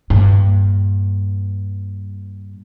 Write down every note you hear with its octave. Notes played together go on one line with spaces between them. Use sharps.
G2 A#2